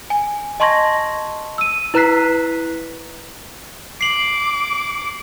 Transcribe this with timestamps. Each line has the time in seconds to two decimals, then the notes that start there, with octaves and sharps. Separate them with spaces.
0.10 G#5
0.60 D#5 A5 C6 C#6 G#6 A#6
1.58 E6 D#7
1.94 E4 B4 A#5 F#6 B6 C7
4.01 D6 C7 F#7